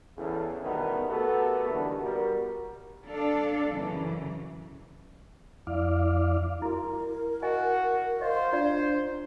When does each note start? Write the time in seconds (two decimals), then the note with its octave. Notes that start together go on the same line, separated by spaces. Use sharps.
0.18 E2 C#3 A4
0.62 B2 D#3 G3 A3 B3
1.08 A3 B3 F#4 G4 A4 A#4
1.69 D#2 D3 E3 G3 B3 F#4
2.01 G3 B3 F#4 A#4
3.05 D4 A4 F5
3.72 F#2 C#3 E3
5.67 F2 E4 D5 F5
6.62 E4 F#4 A#4
7.42 F#4 D#5 F5 G#5
8.21 C5 D#5 F5
8.53 D4 F4 D5 F5